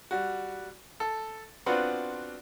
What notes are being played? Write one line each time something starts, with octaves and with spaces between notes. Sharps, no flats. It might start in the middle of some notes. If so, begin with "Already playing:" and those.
G3 F#4
A4
B3 C4 D4 F4 F#4 B4